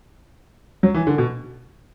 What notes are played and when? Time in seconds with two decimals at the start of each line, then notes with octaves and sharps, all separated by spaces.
0.83 F#3
0.94 E3
1.07 D3
1.18 B2